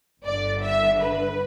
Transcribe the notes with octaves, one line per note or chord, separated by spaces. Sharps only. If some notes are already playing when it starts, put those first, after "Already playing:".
G1 G2 D3 D5
E5
B4